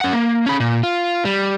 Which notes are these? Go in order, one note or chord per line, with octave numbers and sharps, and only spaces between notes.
C#4 F#5
A#3
C#4 B5
A#2
F4
G3